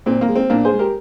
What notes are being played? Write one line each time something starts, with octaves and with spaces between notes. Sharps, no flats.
A#2 C4
A#3
G#3
C4
A#2 A#3 D4
G#4 C5
G#3
G4 A#4